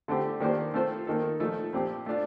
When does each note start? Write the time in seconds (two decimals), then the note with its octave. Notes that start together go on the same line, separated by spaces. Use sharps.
0.08 D3 A3 C4 G4
0.40 D#3 A#3 D4 G4 C5
0.74 A3 C4 F4 A4 C5
1.07 D#3 A#3 D#4 A4
1.40 A#2 F3 A3 D#4 A4
1.73 A#2 F3 C4 G4
2.06 A3 D4 F4